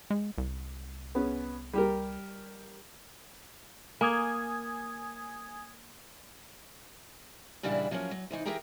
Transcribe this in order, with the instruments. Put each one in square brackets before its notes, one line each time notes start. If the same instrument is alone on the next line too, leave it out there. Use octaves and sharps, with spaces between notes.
[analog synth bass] G#3
C2
[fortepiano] B3 C#4 G#4
G3 G4 A#4
[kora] A#3 [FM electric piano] G#5 D#6 G#6
[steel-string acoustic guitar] A#2 C#3 E3 G3 D4 E4
F3 F#3 A#3 C4 C#4
F#3
C3 E3 D#4
E3 G4 G#4 A#4 G5 A#5